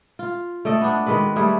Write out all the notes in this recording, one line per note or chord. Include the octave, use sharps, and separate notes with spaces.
F4
A3 D5 D#5
B3 D4
D#3 G#3 F#4 B4
G3 A3 G#4